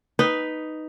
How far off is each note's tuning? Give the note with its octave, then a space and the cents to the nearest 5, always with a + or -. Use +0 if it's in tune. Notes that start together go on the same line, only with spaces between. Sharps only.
D#4 +0 B4 +0